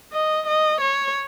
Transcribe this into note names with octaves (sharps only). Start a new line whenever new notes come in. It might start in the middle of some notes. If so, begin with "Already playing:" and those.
D#5
D#5
C#5